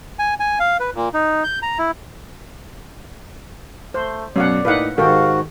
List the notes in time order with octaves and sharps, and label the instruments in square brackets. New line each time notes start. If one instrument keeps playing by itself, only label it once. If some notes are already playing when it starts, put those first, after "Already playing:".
[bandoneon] G#5
G#5
F5
B4
A#2
D#4
G6
A#5
E4
[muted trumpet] A3 [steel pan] C5
[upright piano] F#2 B2 [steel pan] C#5 F5 F#5 [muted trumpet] D5
[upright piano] A2 A#3 D#4 [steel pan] B4 F5 F#5
[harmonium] G#2 F#4 [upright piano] D#3 [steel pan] G4 A4 G5 [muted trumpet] F5